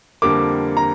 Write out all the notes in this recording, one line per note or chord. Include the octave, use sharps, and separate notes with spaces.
F2 D3 G3 A#3 D6
A#5